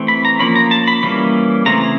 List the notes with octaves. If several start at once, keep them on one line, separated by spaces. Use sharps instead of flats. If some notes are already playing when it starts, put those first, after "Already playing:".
Already playing: E3 A3 C4
B5
A#5
F3 A#3 C#4 B5
A#5
A5
B5
E3 G3 A#3 C#4 B5
C#3 E3 A3 C4 A#5